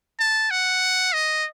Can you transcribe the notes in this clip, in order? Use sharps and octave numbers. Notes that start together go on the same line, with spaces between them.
A5
F#5
D#5